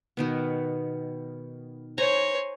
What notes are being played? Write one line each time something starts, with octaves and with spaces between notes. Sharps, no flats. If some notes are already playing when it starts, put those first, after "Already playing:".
B2 D#3 B3
C5 C#5 G#5 A#5